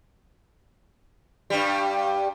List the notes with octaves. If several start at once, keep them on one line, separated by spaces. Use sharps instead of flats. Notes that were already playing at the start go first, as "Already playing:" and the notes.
G2 G3